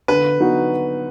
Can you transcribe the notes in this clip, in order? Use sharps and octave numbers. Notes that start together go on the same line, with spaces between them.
D3 B4
F#3 B3 D#4 F#4